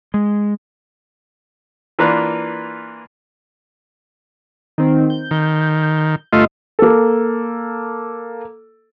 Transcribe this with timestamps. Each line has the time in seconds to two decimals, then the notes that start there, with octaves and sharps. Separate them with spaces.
0.14 G#3
1.99 E3 A#3 D4 F4 B4
4.78 D#3 C4
5.10 G6
5.31 D#3
6.33 G1 A3 F4 D#5
6.79 A#3 A4